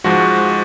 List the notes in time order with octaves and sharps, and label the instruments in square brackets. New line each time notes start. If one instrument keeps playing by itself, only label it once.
[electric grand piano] G#2 F3 G#3 F#4